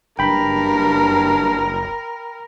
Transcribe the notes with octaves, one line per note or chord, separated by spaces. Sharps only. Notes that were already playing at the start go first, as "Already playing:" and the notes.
F#1 G2 A#4 G5 B5